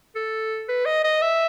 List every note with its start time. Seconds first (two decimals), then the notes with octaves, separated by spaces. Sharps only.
0.16 A4
0.69 B4
0.85 D#5
1.04 D#5
1.22 E5